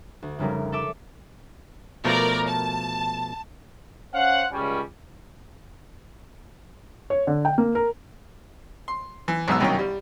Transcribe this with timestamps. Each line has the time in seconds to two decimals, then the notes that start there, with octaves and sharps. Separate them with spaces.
0.22 D2
0.39 F1 C#3 G3 A#4
0.72 A4 E5 A5 D6 E6
2.05 B2 F3 A3 A#4 D5
2.46 A5
4.14 C#4 C5 F5 F#5
4.52 C#2 G3 C#4
7.10 C#5
7.27 D3
7.45 G5
7.58 A#3
7.75 A#4
8.88 C6
9.28 E3
9.48 B1 G#2 B2 B3 E6
9.60 C2 F#2 D#3 C#4 G5
9.79 G3